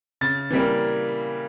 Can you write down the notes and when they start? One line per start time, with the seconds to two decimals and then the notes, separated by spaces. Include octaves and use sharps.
0.21 C#3 A6
0.50 E3 G3 A#3